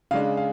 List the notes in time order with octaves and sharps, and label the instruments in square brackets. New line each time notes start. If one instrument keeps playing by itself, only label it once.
[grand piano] C#3 G#3 D4 F5
F5